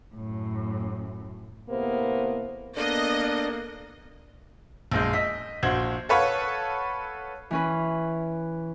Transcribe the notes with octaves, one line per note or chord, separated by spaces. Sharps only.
F#2 A2
A2 C3 A#3 B3 C5
A#3 B3 D4 A4 D5 D#5
A#1 F#2 G#3 G6
D#5 E6 B6
A#1 F#4 C5 G#6 F#7
A4 B4 C#5 F5 F#5
E3 C#4 B4